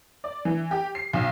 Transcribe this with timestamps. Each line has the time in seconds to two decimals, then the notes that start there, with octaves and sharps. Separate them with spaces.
0.24 D5
0.45 E3
0.71 G4
0.95 C7
1.13 B1